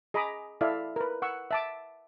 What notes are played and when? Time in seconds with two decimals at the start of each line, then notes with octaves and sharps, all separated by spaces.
0.14 G#4 D#5 A#5 B5 D6 D#6
0.61 E4 A4 D5 E5 F5
0.96 A#4 B4
1.22 F#5 C#6 E6
1.51 E5 A5 D6